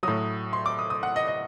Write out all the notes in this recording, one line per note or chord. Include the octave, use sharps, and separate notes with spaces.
A2 F#3 D#6
C6
D6
D#6
D#6
F#5
D#5
D#5